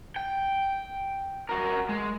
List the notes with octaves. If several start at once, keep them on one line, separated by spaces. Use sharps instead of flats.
G5
F#4 A#4
G#3